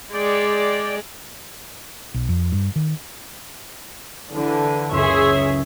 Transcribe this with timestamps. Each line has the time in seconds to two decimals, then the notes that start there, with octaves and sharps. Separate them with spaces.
0.13 G#3 D5 G5
2.14 B1
2.29 F2
2.52 G2
2.76 D#3
4.32 D3 E3
4.91 F#1 C#2 G#4 C#5 E5 C6